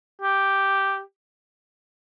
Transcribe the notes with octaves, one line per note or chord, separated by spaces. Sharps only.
G4